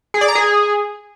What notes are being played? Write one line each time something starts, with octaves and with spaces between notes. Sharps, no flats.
G#4
D5
A#5
G#4